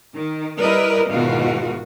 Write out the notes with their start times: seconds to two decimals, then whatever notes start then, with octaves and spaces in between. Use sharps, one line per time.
0.14 D#3
0.60 G3 E4 A#4 B4 D5 D#5
1.10 E2 G#2 B2 D#3 F4 F#4